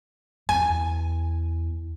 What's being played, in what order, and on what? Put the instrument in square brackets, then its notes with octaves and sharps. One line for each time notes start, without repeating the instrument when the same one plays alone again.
[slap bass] E2 [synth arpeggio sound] G#5